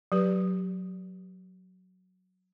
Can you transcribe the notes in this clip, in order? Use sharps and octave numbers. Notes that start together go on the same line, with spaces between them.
F#3 G4 B4